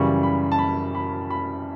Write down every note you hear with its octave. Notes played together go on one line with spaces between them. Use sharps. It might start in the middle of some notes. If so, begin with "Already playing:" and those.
Already playing: F#2 C#3 E3 G3 C#6
B5
A5
B5
B5
B5